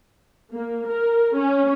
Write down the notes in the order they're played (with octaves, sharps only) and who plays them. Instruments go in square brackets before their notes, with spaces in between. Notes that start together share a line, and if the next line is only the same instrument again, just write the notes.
[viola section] A#3
A#4
C#4